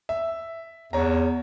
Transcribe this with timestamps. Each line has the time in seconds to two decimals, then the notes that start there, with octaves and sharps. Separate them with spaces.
0.09 E5
0.93 E2 C#5 A#5